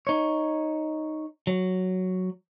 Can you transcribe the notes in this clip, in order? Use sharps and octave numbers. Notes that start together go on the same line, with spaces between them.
D#4 C#5
F#3